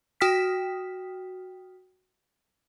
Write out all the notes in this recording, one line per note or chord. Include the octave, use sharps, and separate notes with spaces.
F#4 G5 D#6 F6 B6